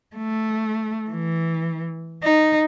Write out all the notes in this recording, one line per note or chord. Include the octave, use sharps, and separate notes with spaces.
A3
E3
D#4